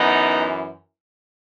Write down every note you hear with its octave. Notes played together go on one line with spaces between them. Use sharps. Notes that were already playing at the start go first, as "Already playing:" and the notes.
Already playing: F#2 E3 B3 D#4